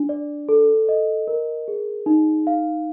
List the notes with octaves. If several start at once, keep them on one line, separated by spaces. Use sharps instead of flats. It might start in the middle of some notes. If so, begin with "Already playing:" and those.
Already playing: D4
D5
A4
D#5
A#4
G#4
D#4
F5